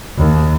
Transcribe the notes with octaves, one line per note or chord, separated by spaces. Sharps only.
D#2